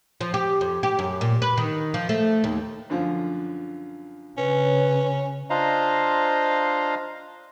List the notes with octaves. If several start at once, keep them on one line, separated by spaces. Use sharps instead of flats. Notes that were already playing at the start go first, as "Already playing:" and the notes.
F3
G4
F2
G4
F#2
A#2
B4
D#3
F3
A3
D#2
F#2 D3 F3
C#3 C#4 B4
D4 F4 C5 D#5 F5 A#5